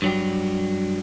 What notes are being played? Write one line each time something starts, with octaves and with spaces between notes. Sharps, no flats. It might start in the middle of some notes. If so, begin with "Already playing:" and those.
G2 F#3 G3